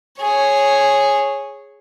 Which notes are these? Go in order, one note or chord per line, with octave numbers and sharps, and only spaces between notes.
G#4 C#5